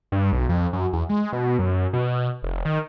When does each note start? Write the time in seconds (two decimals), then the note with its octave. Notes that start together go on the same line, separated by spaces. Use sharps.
0.12 G2
0.32 B1
0.49 F2
0.73 F#2
0.93 E2
1.09 G#3
1.33 B2
1.59 F#2
1.93 B2
2.43 F1
2.65 D#3